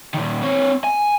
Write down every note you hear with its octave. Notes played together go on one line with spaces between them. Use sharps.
A#2 D#3
C4 C#5
G#5